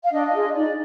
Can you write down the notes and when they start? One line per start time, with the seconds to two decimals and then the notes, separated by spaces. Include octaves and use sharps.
0.04 F5
0.13 D4 D#5
0.33 F4 G#4
0.54 D#4 D5